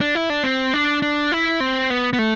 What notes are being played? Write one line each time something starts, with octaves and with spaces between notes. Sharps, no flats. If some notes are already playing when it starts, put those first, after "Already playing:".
D4
E4
D4
C4
D4
D4
E4
C4
B3
B3
A3